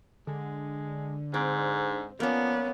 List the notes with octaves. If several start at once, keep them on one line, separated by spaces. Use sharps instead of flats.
D3 G#3
G#2 C4
F3 A#3 B3 C#4 D5